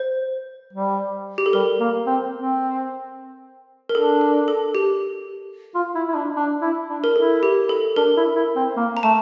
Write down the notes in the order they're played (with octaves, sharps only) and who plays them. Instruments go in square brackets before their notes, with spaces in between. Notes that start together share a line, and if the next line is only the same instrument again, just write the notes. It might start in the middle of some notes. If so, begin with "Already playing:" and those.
Already playing: [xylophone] C5
[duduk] G3
[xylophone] G4
A4
[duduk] G3 [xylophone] A#4
[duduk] A#3
C4
C4
[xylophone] A#4
[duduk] D4 [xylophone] A4
[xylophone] A4
A4
G4
[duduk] F4
E4
E4
D4
D4
E4
D4
[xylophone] A#4
[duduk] E4 [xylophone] A4
[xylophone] G4
A4
[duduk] D4 [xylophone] A#4
[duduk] E4
E4
C4
A#3
[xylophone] A#5
[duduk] A3 [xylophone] A5